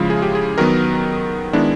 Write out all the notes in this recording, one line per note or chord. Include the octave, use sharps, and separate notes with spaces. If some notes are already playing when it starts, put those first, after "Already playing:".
Already playing: C#3 F3 G#3 E4 F4
G#4
G4
G#4
D#3 F#3 B3 A#4
D#3 G#3 B3 D4 E4